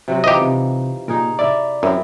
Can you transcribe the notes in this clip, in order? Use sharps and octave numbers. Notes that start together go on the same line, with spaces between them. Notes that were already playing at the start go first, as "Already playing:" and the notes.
C3 F#3 C4
E3 F3 D#4 G4 D#5
C3
A#2 D#4 G#4 A#4
E4 A#4 D5 E5
F#2 C4 E4